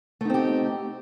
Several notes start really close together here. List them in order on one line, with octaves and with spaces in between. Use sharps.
A3 D#4 C4 G4